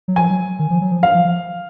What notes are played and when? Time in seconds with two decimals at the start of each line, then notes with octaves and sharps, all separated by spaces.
0.08 F#3
0.16 F3 G#5
0.30 F#3
0.59 D#3
0.70 F3
0.81 F#3
0.92 F3
1.03 F5
1.14 F3
1.25 F3